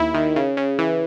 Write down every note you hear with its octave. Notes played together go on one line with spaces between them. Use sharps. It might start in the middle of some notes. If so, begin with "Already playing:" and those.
Already playing: D#2 E4
D#3
C#3
C#3
E3